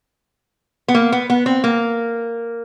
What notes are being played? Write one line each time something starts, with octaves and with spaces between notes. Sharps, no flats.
B3
A#3
B3
B3
C4
A#3